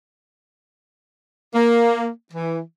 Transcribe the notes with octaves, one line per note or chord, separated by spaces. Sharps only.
A#3
E3